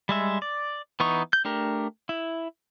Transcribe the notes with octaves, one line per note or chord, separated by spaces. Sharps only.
G3 G#3 E5
D5
E3 B3 D#4 C#6
G6
A3 D4 G4 A#4
E4